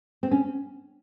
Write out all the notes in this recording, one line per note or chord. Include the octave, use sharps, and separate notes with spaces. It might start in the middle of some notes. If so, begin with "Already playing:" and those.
C4
C#4